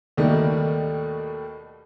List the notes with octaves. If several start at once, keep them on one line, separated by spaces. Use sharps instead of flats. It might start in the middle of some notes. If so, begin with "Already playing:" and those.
D#2 B2 D#3 G3 A3 A#3